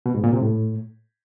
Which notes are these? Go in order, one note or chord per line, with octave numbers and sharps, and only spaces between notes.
B2
G#2
A#2
C3
A2